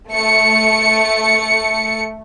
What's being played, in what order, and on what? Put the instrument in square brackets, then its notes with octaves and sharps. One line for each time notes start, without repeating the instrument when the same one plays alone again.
[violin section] A3 C#7